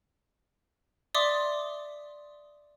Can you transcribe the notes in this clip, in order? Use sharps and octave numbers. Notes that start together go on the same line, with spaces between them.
D5 E5 C6 D6 D#6